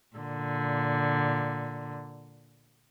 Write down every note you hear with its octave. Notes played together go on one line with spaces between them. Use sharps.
A#2 D3